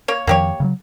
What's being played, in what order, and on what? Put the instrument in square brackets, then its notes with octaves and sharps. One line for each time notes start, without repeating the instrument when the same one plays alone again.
[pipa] A#3 C#5
[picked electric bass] F2 D#3 F3 [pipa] A#3 G4 C#5
[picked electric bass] C#3 E3 F#3